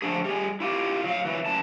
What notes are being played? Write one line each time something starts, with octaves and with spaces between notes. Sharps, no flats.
D3 F3 A3 D4 G#4
G3 G#4
E4 F4 G4
F#3 F5
E3 F#3
F#2 E3 A5